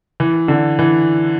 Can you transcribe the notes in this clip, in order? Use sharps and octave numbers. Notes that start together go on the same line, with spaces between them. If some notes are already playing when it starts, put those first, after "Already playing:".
E3
D3
E3